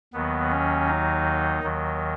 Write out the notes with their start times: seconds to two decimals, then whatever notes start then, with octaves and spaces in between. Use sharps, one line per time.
0.13 D#2 D#3 F#3 B3
0.51 C#4
0.88 D#4
1.63 D#2 D#3 F#3